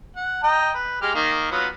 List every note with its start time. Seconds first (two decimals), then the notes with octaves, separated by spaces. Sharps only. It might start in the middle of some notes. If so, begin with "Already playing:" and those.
0.16 F#5
0.43 D#5 G5 A#5
0.74 B4
1.02 G#3 G4 F6
1.15 D#3 A#3
1.51 F#3 B3 F4